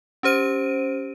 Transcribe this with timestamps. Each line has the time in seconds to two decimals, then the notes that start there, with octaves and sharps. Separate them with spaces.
0.23 C#4 G4 C5 D7 D#7